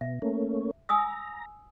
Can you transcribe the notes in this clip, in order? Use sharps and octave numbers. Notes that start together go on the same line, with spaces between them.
B2 E5
A3 A#3 C#4
G#5 A#5 D#6 E6